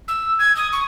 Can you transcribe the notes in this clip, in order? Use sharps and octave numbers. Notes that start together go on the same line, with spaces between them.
E6
G#6
D#6
C#6